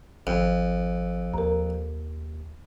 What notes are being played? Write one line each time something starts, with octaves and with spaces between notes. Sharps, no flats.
G#1 F2
D#2 A#4 A#5